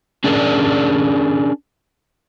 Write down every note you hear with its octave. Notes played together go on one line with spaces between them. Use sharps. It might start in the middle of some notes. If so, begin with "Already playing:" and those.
C#4 D4 G#4 A#4 D5